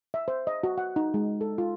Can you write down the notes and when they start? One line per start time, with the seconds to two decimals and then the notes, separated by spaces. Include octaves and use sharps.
0.14 E5
0.28 C5
0.47 D#5
0.63 F#4
0.78 F#5
0.96 D#4
1.14 G#3
1.41 A4
1.58 F4